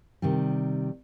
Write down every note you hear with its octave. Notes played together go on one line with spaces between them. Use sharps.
C3 D#3 G3